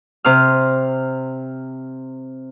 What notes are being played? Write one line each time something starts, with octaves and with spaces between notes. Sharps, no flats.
C3 C6 F6